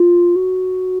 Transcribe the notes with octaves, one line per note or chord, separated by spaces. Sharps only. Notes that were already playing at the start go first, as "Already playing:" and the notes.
Already playing: F4
F#4